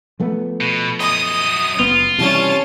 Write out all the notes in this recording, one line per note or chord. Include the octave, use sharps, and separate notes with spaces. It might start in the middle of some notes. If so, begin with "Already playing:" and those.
F3 A3 B3
B2
F#2 D#5 D#6
F#1 B3 F4
C3 E3 G3 C#4 A5